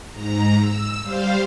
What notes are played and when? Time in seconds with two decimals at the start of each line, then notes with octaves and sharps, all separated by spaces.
0.12 G#2 A#5
0.60 E6
1.02 G3 C5 F5